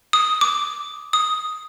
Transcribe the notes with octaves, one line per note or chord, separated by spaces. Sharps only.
D#6
D6
D#6